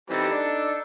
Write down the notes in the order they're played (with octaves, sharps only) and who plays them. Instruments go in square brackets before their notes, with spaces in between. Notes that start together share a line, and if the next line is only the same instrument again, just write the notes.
[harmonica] E3 G3 C4 [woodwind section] D#4 A4
[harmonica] D4